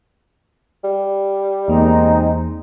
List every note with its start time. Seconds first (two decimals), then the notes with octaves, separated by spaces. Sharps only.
0.84 G3
1.68 E2 G#3 A#3 C4 D#4